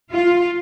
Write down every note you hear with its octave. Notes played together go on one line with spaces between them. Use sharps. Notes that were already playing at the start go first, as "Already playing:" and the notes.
F4